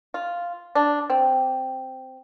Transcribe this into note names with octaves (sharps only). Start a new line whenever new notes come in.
F4
D4
C4